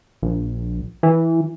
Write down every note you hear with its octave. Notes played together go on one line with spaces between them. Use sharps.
A#1
E3